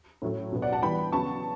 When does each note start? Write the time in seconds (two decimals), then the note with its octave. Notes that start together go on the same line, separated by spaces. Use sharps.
0.22 A2 F#3 A3 C#4
0.52 B2 F#3 B3
0.62 D5 F#5
0.72 F#5 A5
0.82 E3 G3 B3 G5 B5
1.12 C#3 F#3 B3 A5 C#6